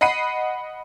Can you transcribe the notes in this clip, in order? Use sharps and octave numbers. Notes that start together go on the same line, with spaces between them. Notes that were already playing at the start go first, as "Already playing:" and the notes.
D#5 F#5 B5 C7 D#7